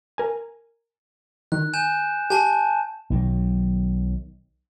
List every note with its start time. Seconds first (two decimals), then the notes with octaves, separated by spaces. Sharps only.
0.18 A#4 G#5
1.52 D#3 F#6
1.74 G#5 G6 E7
2.30 G4 G#5 A5
3.10 B1 D#3 F#3